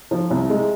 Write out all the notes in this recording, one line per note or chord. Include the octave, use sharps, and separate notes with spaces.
F3
C2
G#3